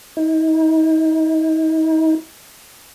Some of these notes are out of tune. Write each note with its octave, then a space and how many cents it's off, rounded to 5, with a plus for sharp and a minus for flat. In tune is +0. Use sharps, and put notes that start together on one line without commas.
D#4 +40